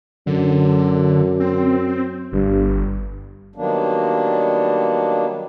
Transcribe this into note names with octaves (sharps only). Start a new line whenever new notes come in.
F#2 D3
C4
G1 G2
D#3 F#3 G3 A#3 B3 D4